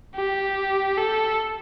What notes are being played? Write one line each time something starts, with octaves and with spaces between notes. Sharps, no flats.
G4
A4